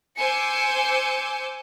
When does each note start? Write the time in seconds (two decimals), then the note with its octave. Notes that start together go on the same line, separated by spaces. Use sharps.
0.20 C5 G#5 D6 E6 G6 C#7